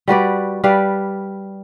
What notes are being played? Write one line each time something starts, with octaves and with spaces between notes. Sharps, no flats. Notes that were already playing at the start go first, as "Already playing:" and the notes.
G3 F#4 B4 D5
G3 B4 D5 F5